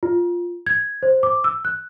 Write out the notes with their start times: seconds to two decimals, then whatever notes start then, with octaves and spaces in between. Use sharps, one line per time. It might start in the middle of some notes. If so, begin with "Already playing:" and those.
0.03 F4
0.66 G#6
1.03 C5
1.23 D6
1.44 E6
1.65 F#6